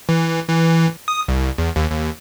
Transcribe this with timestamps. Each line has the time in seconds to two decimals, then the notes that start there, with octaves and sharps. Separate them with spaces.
0.09 E3
0.49 E3
1.08 D#6
1.28 C2
1.58 E2
1.76 D#2
1.91 D#2